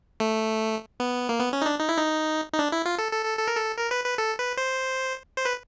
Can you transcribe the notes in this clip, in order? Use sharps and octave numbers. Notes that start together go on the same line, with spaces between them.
A3
B3
A#3
B3
C#4
D#4
D4
D#4
E4
D#4
D#4
D4
E4
F4
A4
A4
A4
A4
A#4
A4
A#4
B4
B4
A4
B4
C5
C5
B4